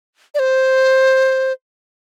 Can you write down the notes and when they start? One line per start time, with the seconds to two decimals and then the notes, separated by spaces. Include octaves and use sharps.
0.35 D5
0.39 C5